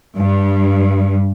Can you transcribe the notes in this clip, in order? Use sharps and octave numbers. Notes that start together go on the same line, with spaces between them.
G2